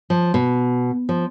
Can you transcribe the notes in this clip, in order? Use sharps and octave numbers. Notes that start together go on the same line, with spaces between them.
F3
B2
F3